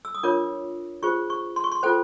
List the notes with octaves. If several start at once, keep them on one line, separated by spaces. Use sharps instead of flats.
E6
D#6
D4 F4 A#4 C#5 D6
F4 G#4 C5 C#6
C#6
C6
C#6
C6
F4 A4 C5 G5